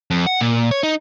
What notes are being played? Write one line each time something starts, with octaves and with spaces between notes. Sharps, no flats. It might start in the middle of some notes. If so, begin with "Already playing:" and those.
F2
F#5
A#2
C#5
D#4